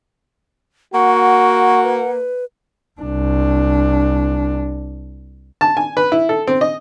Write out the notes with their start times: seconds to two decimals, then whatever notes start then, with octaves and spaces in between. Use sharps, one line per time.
0.94 A#3 F#4 F#5 C#6
1.83 B4
3.01 C2 D4
5.61 A5
5.77 G#5
5.97 B4
6.12 E4
6.29 A4
6.47 C4
6.61 D#5